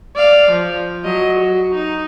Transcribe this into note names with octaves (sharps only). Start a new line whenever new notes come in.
D5 F5
F3
F#3 D#5
F#4
D#4